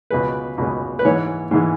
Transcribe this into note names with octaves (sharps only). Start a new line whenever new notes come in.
C#2 B2 G#3 B4
C#2 B2 G#3
B4
G#2 E3 G#3 C#5
G#2 E3 G#3